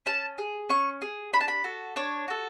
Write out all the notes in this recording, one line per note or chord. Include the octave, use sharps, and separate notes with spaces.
C#4 A5
G#4
C#4 C#6
G#4
D4 B5
A5
B5
F#4 A4
D4 C#5
F#4 A4